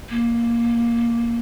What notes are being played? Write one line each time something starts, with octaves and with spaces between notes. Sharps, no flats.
A#3